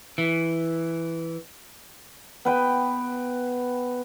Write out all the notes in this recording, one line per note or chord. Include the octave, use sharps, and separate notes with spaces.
E3
B3 B4 G5